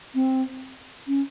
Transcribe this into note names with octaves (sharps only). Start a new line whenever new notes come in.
C4
C#4